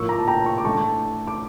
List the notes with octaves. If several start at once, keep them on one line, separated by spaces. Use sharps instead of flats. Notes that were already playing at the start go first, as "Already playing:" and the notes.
Already playing: A2 F3 A#3 C#6 E6
A#5 D6
A5
G5 A#5
A5 C#6
D6
E3 A3 D4 A5 C#6
D6